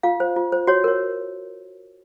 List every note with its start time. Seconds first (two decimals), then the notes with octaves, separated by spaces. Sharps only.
0.03 F4 F5
0.20 C5
0.36 F4
0.52 C5
0.67 F#4 C#5
0.84 A#4 C#5